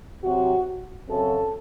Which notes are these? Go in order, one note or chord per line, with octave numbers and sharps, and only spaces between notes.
C3 F#3 C4 F#4
F#2 C#3 F#3 C4 A4